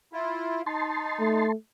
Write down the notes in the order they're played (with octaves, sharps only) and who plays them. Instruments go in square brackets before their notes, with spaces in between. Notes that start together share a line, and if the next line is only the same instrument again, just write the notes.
[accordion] E4 F4
[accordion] D#4 [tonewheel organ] A5 C6
[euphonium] A3